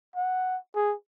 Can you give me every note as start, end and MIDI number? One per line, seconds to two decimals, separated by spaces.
0.16 0.57 78
0.75 0.94 68